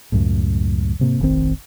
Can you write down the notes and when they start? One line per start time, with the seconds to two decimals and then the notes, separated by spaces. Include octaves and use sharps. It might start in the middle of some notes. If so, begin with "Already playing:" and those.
0.12 C#2 F#2 A2
0.99 G#2 C3 A#3
1.20 F1 A#1 D#3 C4